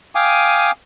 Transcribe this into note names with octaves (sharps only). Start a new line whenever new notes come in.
F5 G5 G#5 D6 D#6